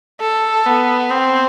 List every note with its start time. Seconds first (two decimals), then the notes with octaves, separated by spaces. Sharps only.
0.21 A4
0.66 B3
1.10 C4